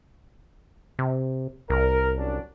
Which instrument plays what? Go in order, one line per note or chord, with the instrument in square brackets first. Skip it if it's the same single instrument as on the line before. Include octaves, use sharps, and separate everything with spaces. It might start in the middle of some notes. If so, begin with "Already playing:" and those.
[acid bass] C3
[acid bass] C2 [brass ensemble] A#4
[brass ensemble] F#3 C#4 D4